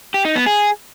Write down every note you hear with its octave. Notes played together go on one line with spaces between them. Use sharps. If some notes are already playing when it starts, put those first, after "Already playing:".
G4
D#4
B3
G#4